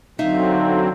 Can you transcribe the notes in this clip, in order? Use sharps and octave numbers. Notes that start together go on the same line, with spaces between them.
D3 F#3 C4 D#4 E5 F5